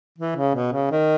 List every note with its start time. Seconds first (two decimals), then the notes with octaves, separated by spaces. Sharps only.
0.18 E3
0.37 C#3
0.55 B2
0.73 C#3
0.91 D#3